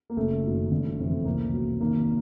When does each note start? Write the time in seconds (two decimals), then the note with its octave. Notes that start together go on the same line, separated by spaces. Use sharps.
0.10 A#3
0.17 F#1 A3
0.44 F#2 D#3 F#3
0.71 G1
0.98 F2 C3 E3
1.25 C2 A#3
1.53 B2 F#3
1.80 G#1 A#3